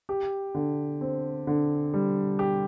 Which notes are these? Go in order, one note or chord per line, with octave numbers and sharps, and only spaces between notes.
G4
D3
C4
D3
G3
G4